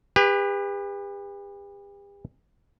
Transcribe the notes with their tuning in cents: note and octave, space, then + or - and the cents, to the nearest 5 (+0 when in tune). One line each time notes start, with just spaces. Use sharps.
G4 +40 B4 +0